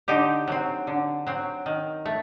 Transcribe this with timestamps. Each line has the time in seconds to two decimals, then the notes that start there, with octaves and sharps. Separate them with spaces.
0.08 D3 D#4 G4
0.48 F#3 C4
0.87 D3
1.27 F#3 C4
1.66 D#3
2.06 A3